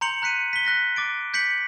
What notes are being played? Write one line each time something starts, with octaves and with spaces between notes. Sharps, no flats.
A#5 C6 G6 C#7 F7 F#7
A#5 F#6 B6 C#7 D#7
B6 G7
F#6 A#6 B6
D6 A6 D7
G6 B6 C#7 F#7